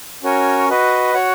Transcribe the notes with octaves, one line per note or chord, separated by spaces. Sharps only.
C#4 F#4 A#4 C#5 G#5
F#4 B4 D#5
F#4 C#5 F#5